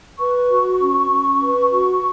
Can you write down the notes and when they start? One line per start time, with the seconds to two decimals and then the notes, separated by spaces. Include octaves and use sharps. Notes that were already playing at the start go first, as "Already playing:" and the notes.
0.19 B4 C#6
0.49 F#4
0.80 C#4
1.11 C#4
1.42 B4
1.72 F#4